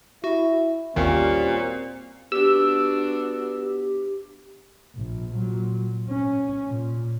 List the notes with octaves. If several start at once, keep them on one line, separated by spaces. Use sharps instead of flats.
E4 F#4
G#1 D#2 A#2 D#3 G3 C4 C#4 F#4
B3 D4 F#4 G4 E6
A#1
A#2 F#3
C#4
A#2